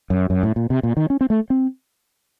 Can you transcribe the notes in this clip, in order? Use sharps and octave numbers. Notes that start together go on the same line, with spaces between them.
F#2
F#2
A2
A#2
C3
A#2
D#3
C#4
C4
A3
C4